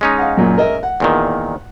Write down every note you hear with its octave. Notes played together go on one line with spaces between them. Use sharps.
G#3 C#4 D#4
F5 F#5
F#2 A#2
A#4 D#5 E5
F#5
E2 A#2 D#3